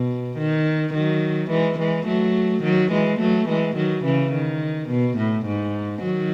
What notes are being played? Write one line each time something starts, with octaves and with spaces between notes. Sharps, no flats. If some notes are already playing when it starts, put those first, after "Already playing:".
Already playing: B2
D#3
D#3 F#3
E3 G#3
E3 G#3
F#3 A3
D#3 F#3
E3 G#3
F#3 A3
E3 G#3
D#3 F#3
C#3 E3
D#3
B2
A2
G#2
D#3 F#3